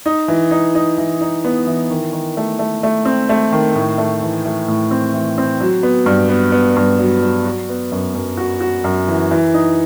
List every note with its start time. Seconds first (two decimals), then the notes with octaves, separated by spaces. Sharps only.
0.06 D#4
0.28 E3
0.51 D#4
0.75 D#4
0.98 E3
1.21 D#4
1.44 B3
1.67 E3
1.90 D#3
2.13 D#3
2.37 A3
2.59 A3
2.83 A3
3.05 C4
3.29 A3
3.52 D#3
3.75 A2
3.98 A3
4.22 E3
4.45 A3
4.68 A2
4.91 C4
5.14 E3
5.38 C4
5.60 F#3
5.83 B3
6.06 G2
6.29 B3
6.52 B3
6.76 G2
6.99 F#3
7.22 F#3
7.45 F#4
7.69 B3
7.92 F#2
8.15 F#2
8.37 F#4
8.61 F#4
8.84 F#2
9.08 E3
9.31 E3
9.54 D#4